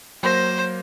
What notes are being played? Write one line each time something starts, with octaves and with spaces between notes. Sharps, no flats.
F#3 A#3 C5 A#6